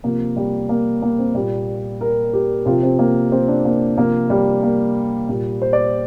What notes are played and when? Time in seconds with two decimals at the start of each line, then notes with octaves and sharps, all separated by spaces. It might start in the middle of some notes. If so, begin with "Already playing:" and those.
0.04 C3 F3 A#3
0.37 G3
0.69 A#3
1.02 A#3
1.19 C4
1.35 A#2 G3
2.01 A#4
2.33 G4
2.66 C3 F3 F4
2.83 C4
2.99 A#3
3.32 C4
3.48 D4
3.65 A#3
3.97 C3 F3 A#3
4.30 G3
4.63 A#3
5.29 A#2 G3
5.62 C5
5.73 D5